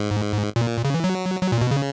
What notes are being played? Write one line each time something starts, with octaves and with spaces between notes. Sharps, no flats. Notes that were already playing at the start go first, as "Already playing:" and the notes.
Already playing: G#2
A#2
C#3
E3
F#3
F#3
A#2
B2
C#3